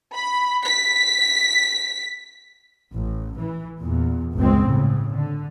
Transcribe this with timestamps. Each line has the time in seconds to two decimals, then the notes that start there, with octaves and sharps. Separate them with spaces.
0.15 B5
0.65 B6
2.95 A1
3.38 E3
3.79 E2 A#2
4.35 G1 C#2 G#3 C4
4.66 A2 C#3
5.12 D3